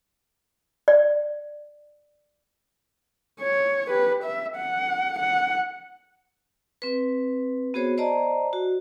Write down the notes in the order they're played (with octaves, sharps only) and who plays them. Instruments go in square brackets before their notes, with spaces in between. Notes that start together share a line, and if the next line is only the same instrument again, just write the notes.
[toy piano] D5
[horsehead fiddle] C#5
G4 B4
E5
F#5
F#5
[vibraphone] C4 B4
B3 F#4 G#4 C5 C#5
C5 D5 D#5 A5 A#5
F#4